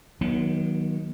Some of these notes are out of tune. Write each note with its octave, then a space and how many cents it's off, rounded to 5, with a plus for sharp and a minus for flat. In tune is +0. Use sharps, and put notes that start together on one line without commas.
D#3 +15 F#3 +0 B3 -40